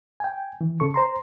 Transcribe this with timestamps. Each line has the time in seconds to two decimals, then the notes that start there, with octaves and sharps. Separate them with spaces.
0.20 G5 G#5
0.61 E3
0.80 C#3 A4 C#6
0.94 C5 A#5 C6